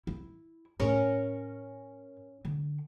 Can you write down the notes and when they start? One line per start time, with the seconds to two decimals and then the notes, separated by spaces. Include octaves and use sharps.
0.07 E4
0.80 A2 C#4 A#4 C#5
2.45 D3